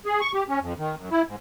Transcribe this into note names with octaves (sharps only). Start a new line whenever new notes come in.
G#4
C#6
G4
C#4
F2
D#3
F#2
E4
G#2